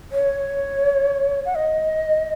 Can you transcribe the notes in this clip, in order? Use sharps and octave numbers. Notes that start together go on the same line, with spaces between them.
C#5
F#5
D#5